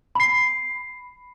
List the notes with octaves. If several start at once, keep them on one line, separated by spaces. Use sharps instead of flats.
B5 C7